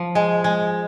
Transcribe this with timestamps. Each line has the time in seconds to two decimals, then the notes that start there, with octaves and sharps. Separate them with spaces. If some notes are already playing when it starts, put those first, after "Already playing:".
Already playing: F3
0.15 G#3
0.44 G#3